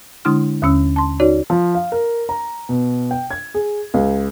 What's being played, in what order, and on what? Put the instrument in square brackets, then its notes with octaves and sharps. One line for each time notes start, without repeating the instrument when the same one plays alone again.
[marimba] D3 G#3 D4 E4 C6 F6
D#2 D3 C#4 E6
A5 C6
D#4 F#4 C#5 D5
[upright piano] F3
F5
A#4
A#5
B2
G5
G#6
G#4
C#2